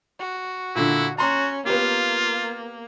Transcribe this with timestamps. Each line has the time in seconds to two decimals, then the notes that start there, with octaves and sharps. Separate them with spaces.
0.20 F#4
0.75 A#2 D3 E4
1.18 C#4 F#4 A#5 C6 C#6
1.66 A#3 B3 F4 G4